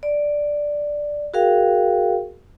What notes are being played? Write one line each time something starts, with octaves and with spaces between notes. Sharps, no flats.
D5
F#4 G#4 A#4 F5 G5